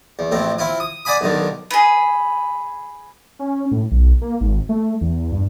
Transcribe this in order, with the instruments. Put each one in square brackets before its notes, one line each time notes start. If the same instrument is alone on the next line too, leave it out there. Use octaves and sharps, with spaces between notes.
[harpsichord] E2
A1 F2 A2 C4
C4 E4 F4
D#6
D5 F#5 G#5 B5 D#6
B1 G2 D3 D#3
[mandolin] G#4 B4
[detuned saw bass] C#4
A2
B1
A#3
G#1
A3
E2
G2